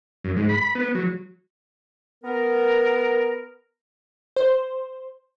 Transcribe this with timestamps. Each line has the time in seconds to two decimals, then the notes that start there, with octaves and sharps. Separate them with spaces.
0.24 F#2
0.36 G#2
0.49 B5
0.62 B5
0.75 B3
0.95 F#3
2.24 B3 A#4
4.36 C5